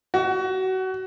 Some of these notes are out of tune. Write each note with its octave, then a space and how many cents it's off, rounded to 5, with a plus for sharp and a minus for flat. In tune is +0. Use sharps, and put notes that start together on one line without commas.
F#4 +25